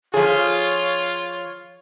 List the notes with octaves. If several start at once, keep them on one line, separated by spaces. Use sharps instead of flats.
F3 F4 G#4 C#5